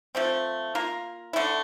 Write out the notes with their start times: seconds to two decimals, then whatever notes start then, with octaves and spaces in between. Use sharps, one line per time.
0.15 F3 A3 C4
0.75 A#3 F4 A#4
1.33 D3 A3 E4